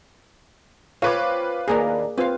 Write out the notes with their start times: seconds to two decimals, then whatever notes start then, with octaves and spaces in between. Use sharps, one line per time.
1.02 C4 F4 B4 C#5 D6
1.68 D#2 A#3 D4 G#4 A#4
2.18 C4 F4 B4 F5